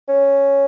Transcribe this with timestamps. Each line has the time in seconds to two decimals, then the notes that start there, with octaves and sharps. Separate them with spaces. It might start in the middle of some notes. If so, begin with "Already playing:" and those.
0.09 C#4